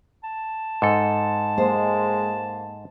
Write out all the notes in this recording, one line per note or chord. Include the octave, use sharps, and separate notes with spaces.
A5
G#2 A4
G#3 A#3 C5